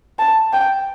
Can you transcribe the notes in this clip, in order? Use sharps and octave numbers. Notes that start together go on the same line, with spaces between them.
A5
G5